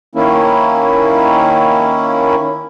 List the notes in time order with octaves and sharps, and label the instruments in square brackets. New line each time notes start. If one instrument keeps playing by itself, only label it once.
[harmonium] D#3 A#3 C#4 E4